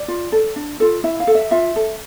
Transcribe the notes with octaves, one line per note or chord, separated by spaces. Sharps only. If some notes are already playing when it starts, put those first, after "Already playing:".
Already playing: D5
F4
A4
D4
F4 A4
E4 E5
F5
A4
E5
F4 E5
A4